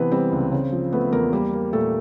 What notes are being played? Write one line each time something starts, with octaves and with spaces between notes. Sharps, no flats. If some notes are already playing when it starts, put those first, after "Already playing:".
Already playing: C3 E3 B3 C4 B4
G3 C4 C5
C#2
C#3
F3
A3 B3 B4
E2 A#3 A#4
G3 A#3 A#4
A#3
A#2 A3 A4